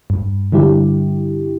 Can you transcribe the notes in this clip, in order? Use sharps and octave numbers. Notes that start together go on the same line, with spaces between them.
G2
D3 G3 E4 G4